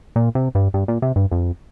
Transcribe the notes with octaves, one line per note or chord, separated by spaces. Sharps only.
A#2
C3
G2
G2
A#2
C3
G2
F2